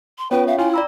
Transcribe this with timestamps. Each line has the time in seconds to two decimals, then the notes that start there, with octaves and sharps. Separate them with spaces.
0.18 C6
0.31 B3 C#4 F4 B4 C#5 G5
0.47 E5 F5 G5
0.58 E4 F4 G#5
0.74 D5 A#5 B5 E6